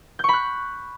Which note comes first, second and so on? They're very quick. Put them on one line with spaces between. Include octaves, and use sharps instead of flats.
G6 C#6 B5 F#6